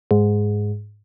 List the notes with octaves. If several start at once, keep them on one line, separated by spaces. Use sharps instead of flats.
G#2